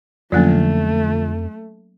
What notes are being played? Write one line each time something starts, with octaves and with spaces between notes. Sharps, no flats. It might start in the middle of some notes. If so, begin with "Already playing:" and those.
F2 D3 F3 F#3 A3 A#3 C#4